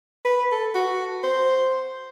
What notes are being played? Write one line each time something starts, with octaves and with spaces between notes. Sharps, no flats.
B4
A4
F#4
C5